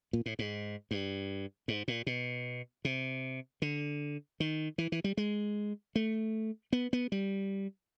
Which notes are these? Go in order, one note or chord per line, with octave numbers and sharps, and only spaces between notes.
A#2
A2
G#2
G2
G#2
A#2
B2
C3
D3
D#3
E3
E3
G3
G#3
A3
B3
B3
G3